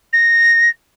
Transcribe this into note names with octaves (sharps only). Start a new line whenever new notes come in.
A#6